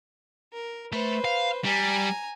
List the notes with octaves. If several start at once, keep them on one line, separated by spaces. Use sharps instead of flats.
A#4
A3 B4 C5
F5
G3 G#5 A#5